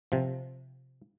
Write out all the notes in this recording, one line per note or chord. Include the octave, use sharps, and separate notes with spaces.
C3 F3